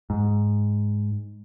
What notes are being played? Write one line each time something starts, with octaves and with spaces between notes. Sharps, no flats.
G#2